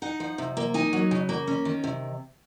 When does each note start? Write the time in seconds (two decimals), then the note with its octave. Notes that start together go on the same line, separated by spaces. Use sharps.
0.02 D#4 F#5
0.20 F3
0.38 C3
0.57 A#3
0.74 D#4 G#5
0.93 F#3
1.11 C#3
1.29 A#3
1.47 C#4
1.65 D#3
1.84 C3